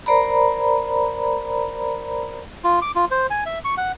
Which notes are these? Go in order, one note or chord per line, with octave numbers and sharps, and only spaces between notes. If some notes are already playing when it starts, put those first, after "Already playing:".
A#4 C5 D5 A#5 B5
F4
D6
F4
C5
G#5
E5
C#6
F#5